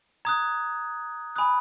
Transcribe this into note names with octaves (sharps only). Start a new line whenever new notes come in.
A#5 D#6 F#6 G#6
G#5 B5 D#6 F#6